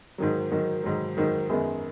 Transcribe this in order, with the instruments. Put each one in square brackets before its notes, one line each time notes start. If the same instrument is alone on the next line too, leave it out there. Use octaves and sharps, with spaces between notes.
[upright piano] G#2 D#3 F#3
G#2 D#3 F#3
G#2 D#3 F#3
G#2 D#3 F#3
F#2 D#3 G#3 B3